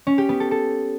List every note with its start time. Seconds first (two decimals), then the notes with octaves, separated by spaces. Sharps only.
0.07 C#4
0.18 G4
0.29 B3
0.40 A4
0.51 A4